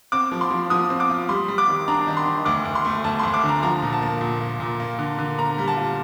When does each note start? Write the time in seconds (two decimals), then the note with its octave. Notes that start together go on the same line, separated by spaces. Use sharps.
0.12 C4 D6
0.32 F3
0.41 C6
0.51 F3
0.70 F3 D#6
0.90 C4
1.00 D6
1.09 F4
1.29 G3 C6
1.48 G3
1.58 D6
1.68 D#3
1.88 D4 A#5
2.07 D#3
2.17 C6
2.26 D#3
2.45 D2 D6
2.65 D2
2.75 C6
2.85 A3
3.04 D2 A5
3.19 C6
3.24 D2
3.34 D6
3.44 D3 A#5
3.63 F3 A#5
3.82 A#2
3.93 A5
4.02 A#3
4.21 A#2
4.41 A#3
4.60 A#2
4.80 A#3
4.99 D3
5.18 D3
5.38 A#3 A#5
5.58 G3
5.68 A5
5.77 F4